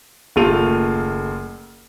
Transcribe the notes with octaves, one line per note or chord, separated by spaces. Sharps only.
F#1 D#2 A3 F4 D#7 F7